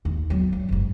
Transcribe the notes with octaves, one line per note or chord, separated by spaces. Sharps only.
D#2
F#3 B3
G3
F#1 G#2